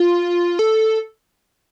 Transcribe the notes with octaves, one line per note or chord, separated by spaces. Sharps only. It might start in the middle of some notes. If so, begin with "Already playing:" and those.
Already playing: F4
A4